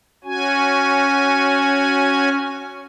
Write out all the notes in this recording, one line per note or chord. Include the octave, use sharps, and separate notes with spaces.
C#4 F#4 G#5